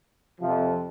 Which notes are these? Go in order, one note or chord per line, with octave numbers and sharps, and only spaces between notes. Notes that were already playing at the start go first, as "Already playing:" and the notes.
F2 C3 F3